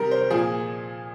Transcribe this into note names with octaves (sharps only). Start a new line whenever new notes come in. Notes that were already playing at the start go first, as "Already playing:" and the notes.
Already playing: C3 D#3 G3 G4 A#4
C5
A#2 F3 G#4